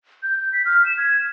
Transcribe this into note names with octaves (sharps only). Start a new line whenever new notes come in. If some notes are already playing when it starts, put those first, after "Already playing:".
G6
G6
B6
F6
E7
G#6